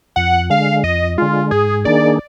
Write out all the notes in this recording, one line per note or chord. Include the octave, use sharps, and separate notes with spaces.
F2 F#5
D3 G#3 F5
F2 D#5
D3 G#3 F4
G#2 G#4
D#3 A#3 D4 G#4 D5